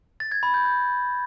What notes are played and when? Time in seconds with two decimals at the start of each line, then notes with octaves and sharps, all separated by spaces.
0.20 A6
0.32 G#6
0.43 B5
0.54 G6
0.65 G6